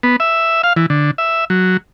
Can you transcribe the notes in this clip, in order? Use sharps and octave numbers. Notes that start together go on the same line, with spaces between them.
B3
E5
F5
E3
D3
E5
F#3